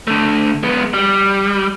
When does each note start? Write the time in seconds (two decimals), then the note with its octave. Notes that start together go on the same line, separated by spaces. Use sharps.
0.07 D3 A3
0.63 G#3 B3
0.94 G3